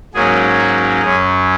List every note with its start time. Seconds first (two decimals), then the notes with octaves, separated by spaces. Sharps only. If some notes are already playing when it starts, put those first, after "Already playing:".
0.14 G#2 F#3 A#3 C#4 G#4
0.58 F#4
1.02 F#2 F#3 C#4 G#4